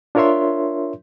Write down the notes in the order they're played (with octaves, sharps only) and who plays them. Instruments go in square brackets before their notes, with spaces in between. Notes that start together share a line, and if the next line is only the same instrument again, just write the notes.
[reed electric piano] D4 F4 A#4 C#5 E5 C6